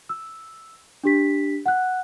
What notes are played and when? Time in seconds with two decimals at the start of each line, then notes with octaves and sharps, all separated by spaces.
0.09 E6
1.04 D4 G4 B6
1.66 F#5 F#6